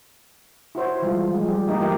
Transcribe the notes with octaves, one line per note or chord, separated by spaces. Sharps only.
E4 F#4 C5 C#5
E3 G3 G#3 F4
F3 G#3
G3 G4
E3 A3 A#3 D#4 G4
E3 F3 A3 E4 G4 A#4